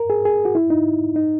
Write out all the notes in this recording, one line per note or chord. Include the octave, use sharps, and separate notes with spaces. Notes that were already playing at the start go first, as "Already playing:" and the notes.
Already playing: A#4
G#4
G#4
F#4
E4
D#4
D#4